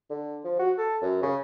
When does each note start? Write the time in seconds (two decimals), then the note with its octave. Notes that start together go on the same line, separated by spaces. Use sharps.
0.10 D3
0.44 F3
0.59 F#4
0.78 A4
1.02 F#2
1.23 C#3